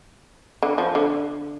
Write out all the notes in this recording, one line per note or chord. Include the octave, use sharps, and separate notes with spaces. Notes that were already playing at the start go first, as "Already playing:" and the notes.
D3
F3
D3